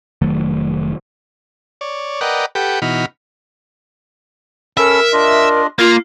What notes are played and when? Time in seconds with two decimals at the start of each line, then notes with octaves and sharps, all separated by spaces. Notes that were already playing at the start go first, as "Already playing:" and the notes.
0.22 F1 D#3 F#3 A3
1.81 C#5 D5
2.21 A#4 B4 D5 D#5 F#5 G5
2.55 G4 A4 B4 F#5 G5
2.82 B2 E3 D#4 F#4 B5 F6
4.77 C#4 A4 A#4 E5 B5
5.13 D4 F4 D#5
5.79 A#3 F4 F5